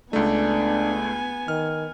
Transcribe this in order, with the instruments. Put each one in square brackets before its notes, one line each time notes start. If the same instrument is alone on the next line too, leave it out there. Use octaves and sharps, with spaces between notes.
[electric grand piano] C#2 A3 [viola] B3 G#5 [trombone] D4
[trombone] D#3 [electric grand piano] F6